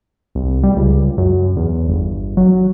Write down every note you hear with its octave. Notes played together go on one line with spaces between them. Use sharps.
C2
G3
C#2
F#2
E2
G1
F#3